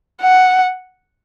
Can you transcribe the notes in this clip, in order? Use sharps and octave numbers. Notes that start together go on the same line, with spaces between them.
F#5